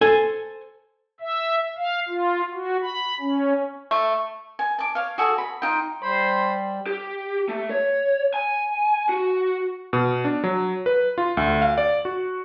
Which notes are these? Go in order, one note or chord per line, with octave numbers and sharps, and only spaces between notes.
A4 C5 G#5
E5
F5
F4
F#4
B5
C#4
A3
G#5
A5 D6
C#5 F5
F#4 G#4 A4 G#5
B5
D#4 F4 G5
G3 C5 B5
G4
A3
C#5
G#5
F#4
B2
D4
F#3
B4
F4
D2
F5
D5
F#4